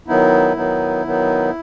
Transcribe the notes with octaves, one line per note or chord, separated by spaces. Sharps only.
D#3 F#3 B3 D#4 E4
D#3 F#3 B3 D#4
D#3 F#3 B3 D#4